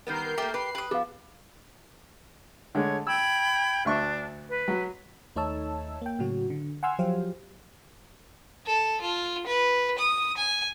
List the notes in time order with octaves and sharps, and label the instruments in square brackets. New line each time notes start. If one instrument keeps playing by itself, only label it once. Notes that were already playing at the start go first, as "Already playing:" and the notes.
[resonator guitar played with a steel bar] D#3 G3 B3 [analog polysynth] A#4 G6 C7
[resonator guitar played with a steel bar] A3 A#3 [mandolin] G4
[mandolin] G4 [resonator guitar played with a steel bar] B4 [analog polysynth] C7
[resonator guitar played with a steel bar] G4 [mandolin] B4 D#6
[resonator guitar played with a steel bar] F3 [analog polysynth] B3 [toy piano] G#4 F5
[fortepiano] D3 G#3 A3 [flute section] C#5
[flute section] G5 B5 G#6 [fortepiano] E6
[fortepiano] D2 E5 C#6 [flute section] D4
[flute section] B4
[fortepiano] F#3
[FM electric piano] D#2 A3 D#4 C#5 A5 E6
A#3 G5
A2 C#3 F#3 F#4
D3
F#5 G#5 C6 E6 F6 G#6
F3 F#3 G4 C5 F5
[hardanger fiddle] A4
F4
B4
D#6
G#5